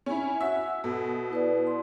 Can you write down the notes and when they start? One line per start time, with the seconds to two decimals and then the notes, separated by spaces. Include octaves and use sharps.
0.06 C#4 E4 G#5
0.41 F#4 E5 E6
0.84 B2 A4
1.31 E4 B4 D5
1.67 C6